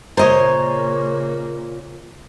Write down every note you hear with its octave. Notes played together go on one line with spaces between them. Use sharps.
A#2 C#3 A#3 C5 C#5 D#5